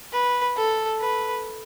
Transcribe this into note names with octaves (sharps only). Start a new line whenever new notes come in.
B4
A4
B4